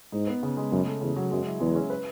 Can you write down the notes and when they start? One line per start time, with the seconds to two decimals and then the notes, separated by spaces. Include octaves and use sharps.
0.12 G#2 D#4
0.27 B3
0.43 C#3
0.57 G#3
0.72 F#2 C#3
0.86 A3
1.01 E2 C#3
1.16 F#3
1.31 F#2 G#3
1.46 E4
1.60 E2 G#3
1.75 C#4
1.90 B4